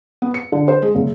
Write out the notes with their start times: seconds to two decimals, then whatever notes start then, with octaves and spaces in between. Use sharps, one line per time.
0.22 B3
0.34 C#7
0.52 D3
0.68 C5
0.83 G#3
0.95 F#1